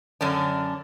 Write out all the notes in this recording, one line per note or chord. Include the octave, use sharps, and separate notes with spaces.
F#2 D3 C#4 D4